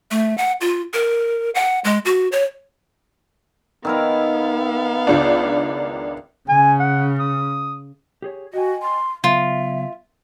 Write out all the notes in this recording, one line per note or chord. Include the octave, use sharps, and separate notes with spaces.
A3
F#5
F4
A#4
F#5
G#3
F#4
C#5
D#3 B3 E4 A#4 F5
C#2 D4
C#3 G#5
F#5
D#6
G4 G#4 C#5
F#4 D#5 G5 G#5
C6
C#3 F#3 B3 F4 E5